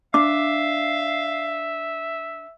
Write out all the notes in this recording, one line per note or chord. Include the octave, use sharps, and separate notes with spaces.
D4 E5 F5 D6